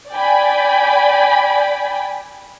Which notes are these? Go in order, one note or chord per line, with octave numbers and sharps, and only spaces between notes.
D5 G5 G#5 B5